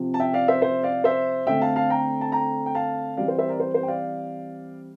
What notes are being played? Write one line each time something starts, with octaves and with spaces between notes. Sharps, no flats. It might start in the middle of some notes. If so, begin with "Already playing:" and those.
Already playing: C3 F3 C4
A5
E5 G5
D5 F5
C5 E5
C5 E5
D5 F5
C5 E5
D3 A3 C4 E5 G5
F5 A5
F5 A5
G5 A#5
A5
G5 A#5
G5
F5 A5
E3 G3 C4 D5 F5
C5
C5 E5
A#4 D5
C5
C5
G5
D5 F5